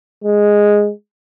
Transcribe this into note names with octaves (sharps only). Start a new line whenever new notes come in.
G#3